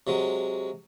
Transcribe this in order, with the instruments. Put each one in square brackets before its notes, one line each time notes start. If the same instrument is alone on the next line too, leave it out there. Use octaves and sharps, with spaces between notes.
[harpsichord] C3 F#3 G#3